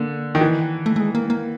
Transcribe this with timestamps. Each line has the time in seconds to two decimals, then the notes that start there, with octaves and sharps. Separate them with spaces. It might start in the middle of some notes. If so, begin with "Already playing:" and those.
Already playing: D3 A#3
0.35 D#3
0.40 E3
0.86 A3
0.96 A3
1.00 G#3
1.15 A#3
1.30 A#3